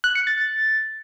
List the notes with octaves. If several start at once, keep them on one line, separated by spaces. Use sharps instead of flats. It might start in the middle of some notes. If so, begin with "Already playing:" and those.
F#6
C#7
A6